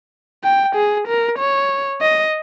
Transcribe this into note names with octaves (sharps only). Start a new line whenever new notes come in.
G5
G#4
A#4
C#5
D#5